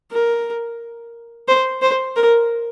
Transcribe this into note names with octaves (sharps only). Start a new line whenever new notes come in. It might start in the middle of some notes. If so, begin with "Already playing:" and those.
A#4
C5
C5
A#4